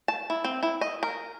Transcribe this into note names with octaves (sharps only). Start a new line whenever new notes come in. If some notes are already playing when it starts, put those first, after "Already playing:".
A5
E4
C4
E4
D#5
A#4